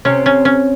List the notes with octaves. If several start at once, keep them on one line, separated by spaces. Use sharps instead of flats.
C3 C#4
C#4
C#4